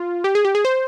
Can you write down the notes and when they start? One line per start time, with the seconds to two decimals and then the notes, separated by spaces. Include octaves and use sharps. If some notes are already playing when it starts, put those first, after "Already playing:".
Already playing: F4
0.24 G4
0.35 G#4
0.45 G4
0.55 G#4
0.65 C5